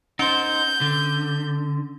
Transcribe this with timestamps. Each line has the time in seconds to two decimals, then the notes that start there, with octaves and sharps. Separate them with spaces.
0.19 C#4 D#4 C5 G6
0.81 D3